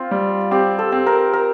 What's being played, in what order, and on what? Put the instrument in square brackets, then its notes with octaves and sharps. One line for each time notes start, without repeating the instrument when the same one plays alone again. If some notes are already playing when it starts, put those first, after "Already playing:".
Already playing: [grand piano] C4 [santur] F4
[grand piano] G3
[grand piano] C4 [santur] G4
[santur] A4
[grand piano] C4
[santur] A#4
A#4